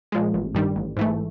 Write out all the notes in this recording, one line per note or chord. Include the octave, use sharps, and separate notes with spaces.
A#2 F3 G#3
A1
G2 D#3 G3
A1
G#2 E3 A3